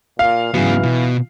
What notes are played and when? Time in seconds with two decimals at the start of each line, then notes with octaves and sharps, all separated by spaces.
0.19 A#2 F5
0.54 G#2 C#3 E3 F#3 B3 G#4
0.83 B2 F4